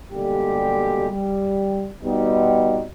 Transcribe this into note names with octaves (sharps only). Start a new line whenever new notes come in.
B2 D3 G3 G#3 A#3 G4
G3
B2 G3 B3 C4 D#4